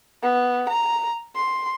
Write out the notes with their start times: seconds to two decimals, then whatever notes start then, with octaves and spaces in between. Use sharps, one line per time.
0.23 B3
0.69 A#5
1.36 C6